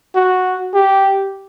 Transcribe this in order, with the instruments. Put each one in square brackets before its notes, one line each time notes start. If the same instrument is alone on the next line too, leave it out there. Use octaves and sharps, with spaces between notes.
[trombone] F#4
G4